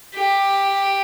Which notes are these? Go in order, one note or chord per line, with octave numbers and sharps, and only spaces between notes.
G4